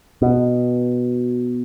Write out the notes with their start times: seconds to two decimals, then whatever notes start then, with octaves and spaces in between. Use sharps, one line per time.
0.22 B2